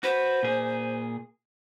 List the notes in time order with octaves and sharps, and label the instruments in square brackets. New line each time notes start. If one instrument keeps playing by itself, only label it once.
[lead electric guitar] F#4 B4 [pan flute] C5
[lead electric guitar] A#2 G#4